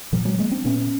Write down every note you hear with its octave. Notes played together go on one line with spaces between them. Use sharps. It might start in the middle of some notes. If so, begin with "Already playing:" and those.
A#2 F3 G3
F#3 G#3
G#3 A#3
C4 D4
A#2 B3 C#4